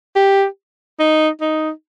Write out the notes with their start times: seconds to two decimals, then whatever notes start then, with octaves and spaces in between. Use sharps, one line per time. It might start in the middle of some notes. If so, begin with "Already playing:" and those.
0.15 G4
0.99 D#4
1.41 D#4